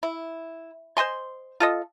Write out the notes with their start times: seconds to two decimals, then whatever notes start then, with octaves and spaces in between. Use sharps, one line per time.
0.03 E4
0.97 C5 D#5 G#5 C6
1.60 F4 A4 D#5